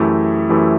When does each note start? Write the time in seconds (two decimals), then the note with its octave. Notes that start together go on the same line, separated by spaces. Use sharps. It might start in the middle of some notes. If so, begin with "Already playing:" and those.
Already playing: F#2 E3 A3 E4 G4
0.49 F#2 E3 A3 E4 G4